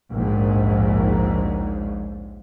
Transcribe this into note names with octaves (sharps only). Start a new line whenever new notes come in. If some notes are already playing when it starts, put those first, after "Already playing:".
A#1 D#2 G#2